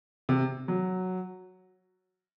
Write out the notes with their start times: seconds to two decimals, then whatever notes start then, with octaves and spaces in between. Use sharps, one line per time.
0.29 C3
0.68 F#3